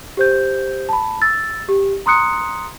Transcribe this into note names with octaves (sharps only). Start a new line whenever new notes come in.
G4 C5 G6
A5 B5
E6 A6
G4
A#5 C6 D#6 F#6 C#7